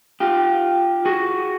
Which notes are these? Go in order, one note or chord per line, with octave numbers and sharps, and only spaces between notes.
F4 G4
F#4 G#4